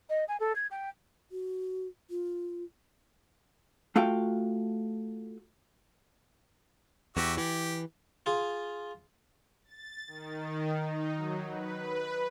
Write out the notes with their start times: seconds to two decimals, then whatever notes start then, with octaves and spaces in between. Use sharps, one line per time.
0.10 D#5
0.28 G#5
0.40 A4
0.56 G#6
0.71 G5
1.31 F#4
2.10 F4
3.96 A3 F4 F#4 F5 G5
7.17 E2 F#4 G4 E5
7.37 E3 G4
8.26 F4 G#4
9.65 A6
10.08 D#3
10.77 D#4
11.13 F#3
11.48 B4
11.79 B4